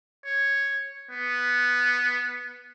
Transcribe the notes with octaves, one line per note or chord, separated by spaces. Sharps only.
C#5
B3